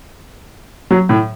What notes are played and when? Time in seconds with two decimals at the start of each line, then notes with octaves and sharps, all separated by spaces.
0.91 F#3
1.09 A2